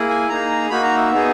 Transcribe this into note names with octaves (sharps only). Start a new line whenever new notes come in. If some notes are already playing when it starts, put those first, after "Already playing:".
Already playing: A#3 E4 G#4
G#5
A#3 D#4 G#4 A#5
A#3 D#4 F#4 B5
A#5
E5
B3 D#4 G#4